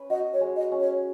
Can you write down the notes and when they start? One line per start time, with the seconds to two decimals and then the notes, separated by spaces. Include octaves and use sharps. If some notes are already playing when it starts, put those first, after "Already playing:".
Already playing: C#4 B4
0.10 F#4 D#5
0.33 C#5
0.41 G#3
0.56 D#5
0.72 C#4
0.80 C#5